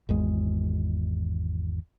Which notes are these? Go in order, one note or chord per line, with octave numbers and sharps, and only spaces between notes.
G#1 E2 G#3